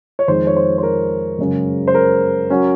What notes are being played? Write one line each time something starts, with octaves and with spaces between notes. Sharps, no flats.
C#5
F2 D#3 G#3 C5
C#5
C5
C5
A#4
F#2 C#3 G#3 C#4
C5
A#4
F#3 C#4